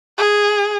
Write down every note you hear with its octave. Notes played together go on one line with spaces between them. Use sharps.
G#4